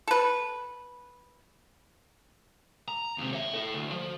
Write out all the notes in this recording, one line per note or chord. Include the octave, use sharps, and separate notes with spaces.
A4 B4
A#5
D#2 C3
C#5 E5
E4 A4
D2
F3